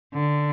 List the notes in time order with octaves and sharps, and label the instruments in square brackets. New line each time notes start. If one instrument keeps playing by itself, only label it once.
[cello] D3